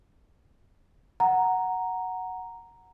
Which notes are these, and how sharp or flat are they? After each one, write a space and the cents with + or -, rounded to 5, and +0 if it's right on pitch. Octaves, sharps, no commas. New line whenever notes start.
F#5 +0 A#5 +0